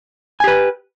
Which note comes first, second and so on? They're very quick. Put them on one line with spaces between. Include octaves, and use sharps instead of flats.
G#5 G4 B4